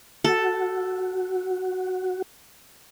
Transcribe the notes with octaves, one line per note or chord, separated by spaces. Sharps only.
F#4 A4